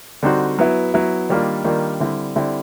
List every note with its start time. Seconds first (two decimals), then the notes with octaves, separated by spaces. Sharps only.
0.23 D3 G3 C4 D#4 F#4
0.59 F#3 B3 E4
0.94 F#3 B3 E4
1.29 D#3 G3 A#3 D4 F4
1.64 D#3 G3 A#3 D4 F4
2.00 D3 G3 C4 E4
2.36 D3 G3 C4 E4